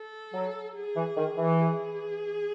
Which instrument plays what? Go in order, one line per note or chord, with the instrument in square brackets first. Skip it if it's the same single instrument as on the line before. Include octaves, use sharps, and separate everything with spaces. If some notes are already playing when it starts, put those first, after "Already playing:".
Already playing: [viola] A4
[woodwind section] F#3
[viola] G#4
[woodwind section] E3
D#3
E3
[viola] G#4